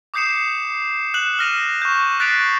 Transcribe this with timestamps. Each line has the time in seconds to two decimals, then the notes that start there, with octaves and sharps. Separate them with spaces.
0.14 D6 D#6 G6 C7 C#7 E7
1.14 F#6 E7 F#7
1.39 F6 A#6 D#7 F7
1.82 C#6 G6
2.20 F#6 A6 B6 C7 D7 F7